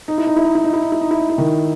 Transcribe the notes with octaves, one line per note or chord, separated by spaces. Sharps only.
D#4
E4
D#4
E4
D#4
E4
D#4
E4
D#4
E4
D#4
E4
D#4
E4
D#3 D#4